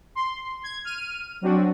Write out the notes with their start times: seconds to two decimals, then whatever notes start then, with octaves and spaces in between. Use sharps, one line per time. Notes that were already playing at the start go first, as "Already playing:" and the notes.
0.15 C6
0.63 G#6
0.84 F6 D#7
1.41 F#3 C4 D4 F#4